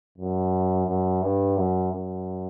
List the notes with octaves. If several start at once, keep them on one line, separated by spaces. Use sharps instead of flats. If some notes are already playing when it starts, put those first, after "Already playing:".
F#2
F#2
G2
F#2
F#2